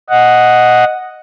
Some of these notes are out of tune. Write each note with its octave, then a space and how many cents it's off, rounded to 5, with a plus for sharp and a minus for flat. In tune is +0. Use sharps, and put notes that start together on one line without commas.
D#5 +0 F#5 +0